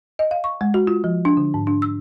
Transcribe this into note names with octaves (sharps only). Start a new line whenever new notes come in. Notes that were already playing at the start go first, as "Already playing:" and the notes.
D#5
F5
C#6
G#3
F#4
F4
F3
D4
D3
G#2
D4
E6